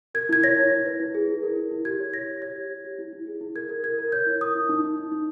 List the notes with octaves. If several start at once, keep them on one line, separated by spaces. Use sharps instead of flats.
A#4 G#6
E4 G#6
C#5 A#6
E4
E4
B4
E4
G#4
E4
A#4
E4
E4
G4 G#6
C#5
C#5 A#6
G4
C#5 G#6
G4
C#5
G4
E4
E4
G#4
E4
A#4 G#6
A#4
A#4 G#6
A#4
C#5 G6
E4
A#4 D#6
E4
D#4
D#4
D#4
D#4